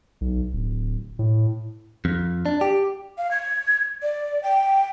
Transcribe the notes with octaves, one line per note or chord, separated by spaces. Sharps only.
B1
D1
A2
F2
D4
G4
F5
G#6
D5
G5